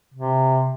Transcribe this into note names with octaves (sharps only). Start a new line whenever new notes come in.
C3